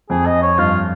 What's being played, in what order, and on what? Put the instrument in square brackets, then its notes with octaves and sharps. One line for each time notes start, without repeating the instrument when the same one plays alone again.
[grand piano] F2 [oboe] G#4
[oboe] D#5
C#5
[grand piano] G2 [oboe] F4